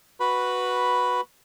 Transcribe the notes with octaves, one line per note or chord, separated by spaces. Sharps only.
F#4 B4 B5